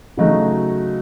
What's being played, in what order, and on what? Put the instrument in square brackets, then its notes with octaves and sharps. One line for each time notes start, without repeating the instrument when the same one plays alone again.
[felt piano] C#3 F#3 A3 D#4 F#4